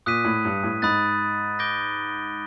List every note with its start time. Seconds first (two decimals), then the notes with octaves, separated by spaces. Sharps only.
0.06 A#2 D#6 F#6 B6 D#7
0.25 A2
0.45 G2
0.63 A2
0.82 G#2 B5 D#6 F#6 A6
1.59 D6 G6 A#6 D7 G7